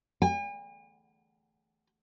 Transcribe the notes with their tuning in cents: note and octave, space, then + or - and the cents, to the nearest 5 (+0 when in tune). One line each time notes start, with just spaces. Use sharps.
G#5 -45